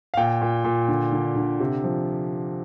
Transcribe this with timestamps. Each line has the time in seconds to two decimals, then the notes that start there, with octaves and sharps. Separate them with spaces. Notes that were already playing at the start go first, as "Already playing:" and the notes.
0.14 F5
0.17 A#2 G5
0.42 A#2
0.64 A#2
0.88 D3
1.12 D3
1.36 D3
1.60 C3
1.84 F3